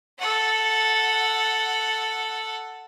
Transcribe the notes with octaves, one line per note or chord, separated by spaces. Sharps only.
A4 F#5